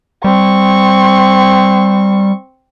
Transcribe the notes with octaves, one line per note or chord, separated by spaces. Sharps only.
G3 C4 C#6